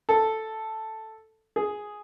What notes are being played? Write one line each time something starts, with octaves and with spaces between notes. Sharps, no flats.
A4
G#4